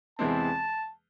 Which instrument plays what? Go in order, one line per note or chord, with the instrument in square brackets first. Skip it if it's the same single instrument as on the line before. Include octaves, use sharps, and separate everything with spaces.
[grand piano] E2 C3 E3 G#3 C4 [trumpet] A5